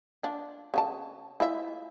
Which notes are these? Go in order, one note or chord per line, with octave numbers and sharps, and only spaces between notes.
D4 F4
C#3 F4 A5
E4 F4 E5